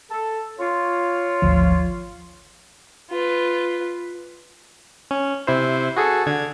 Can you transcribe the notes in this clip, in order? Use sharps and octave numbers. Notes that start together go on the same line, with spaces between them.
A4
F4 C#5
G#1 D2 F3
F4 B4
C#4
C3 E4 C5
F#4 G#4 A4
D3 G#6